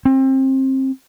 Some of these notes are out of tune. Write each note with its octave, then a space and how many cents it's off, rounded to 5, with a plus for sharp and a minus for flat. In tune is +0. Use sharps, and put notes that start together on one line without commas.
C4 +25